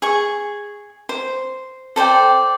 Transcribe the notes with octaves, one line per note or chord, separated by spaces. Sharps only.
G#4 C#6
C5
A4 C5 D5 G5